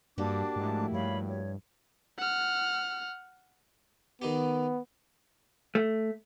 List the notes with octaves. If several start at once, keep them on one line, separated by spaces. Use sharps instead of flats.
G2 A#3 D4 F#4 G4 A5 D6
G#2 F3 A3 E4
G2 C#5 F5 B5
C#5
F#5 F6
D#3 B3 D#4 G4
A3